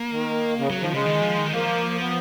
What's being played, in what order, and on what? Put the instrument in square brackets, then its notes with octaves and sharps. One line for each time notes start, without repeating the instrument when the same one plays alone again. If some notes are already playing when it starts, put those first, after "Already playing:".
Already playing: [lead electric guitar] A#3
[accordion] D#3
C#3
[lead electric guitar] F#3
[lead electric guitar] D#3 [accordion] F3
[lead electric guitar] C#3 [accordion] G#3
[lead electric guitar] D#3
F3
D#3
[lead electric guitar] F3 [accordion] A#3
[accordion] B3